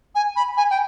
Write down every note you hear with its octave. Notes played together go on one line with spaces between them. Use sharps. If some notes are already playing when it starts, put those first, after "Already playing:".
G#5
B5
G#5
G5